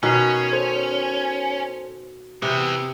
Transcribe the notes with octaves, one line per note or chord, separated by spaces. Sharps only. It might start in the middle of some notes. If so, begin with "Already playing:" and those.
B2 D#3 C#4 F#6 B6 C7
A4 C5
C3 E3 B3 E6